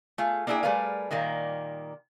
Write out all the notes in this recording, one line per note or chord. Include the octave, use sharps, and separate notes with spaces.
A3 F4 G#4
A#3 D4 E4 F#4 G#4 G5
G3 A3 G#4 A#4 B4 F5
A#2 D#3 G3 A#3